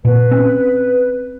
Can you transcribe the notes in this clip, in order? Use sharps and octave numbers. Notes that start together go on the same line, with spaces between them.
A#2 B4
C4 C#4